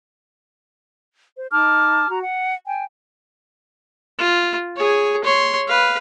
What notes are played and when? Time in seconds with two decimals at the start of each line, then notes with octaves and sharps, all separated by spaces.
1.37 C5
1.51 D#4 A5 D6 F6
2.08 F#4 A#5
2.22 F#5
2.67 G5 G#5
4.19 F4
4.77 G#4 C#5
5.24 C#5 C6
5.68 B4 F5